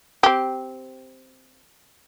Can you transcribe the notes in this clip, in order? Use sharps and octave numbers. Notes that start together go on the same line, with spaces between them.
C4 G4